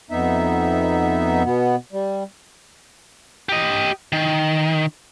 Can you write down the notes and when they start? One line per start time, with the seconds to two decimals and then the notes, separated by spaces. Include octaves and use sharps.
0.11 F2 B3 D#4 E5
1.44 B2 B3
1.92 G3
3.49 G4 D#5
4.12 D#3